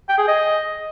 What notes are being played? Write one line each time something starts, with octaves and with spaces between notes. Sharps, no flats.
G5
G#4
D#5